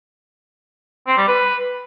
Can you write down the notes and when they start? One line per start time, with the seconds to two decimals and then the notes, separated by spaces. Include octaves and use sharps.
1.07 C4
1.17 G3
1.28 B4